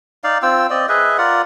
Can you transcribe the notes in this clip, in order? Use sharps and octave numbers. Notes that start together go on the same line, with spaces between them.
D#4 D5 F5
C4 F4 G5 E6
C4 D5 D#5
G#4 B4 D#5 E5
F4 A#4 D5 F#5